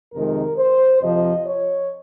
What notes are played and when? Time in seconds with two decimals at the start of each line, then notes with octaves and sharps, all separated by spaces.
0.13 F2 C3 D#3 G#3 A#4
0.58 C5
1.01 F2 C3 F3 D#5
1.46 C#5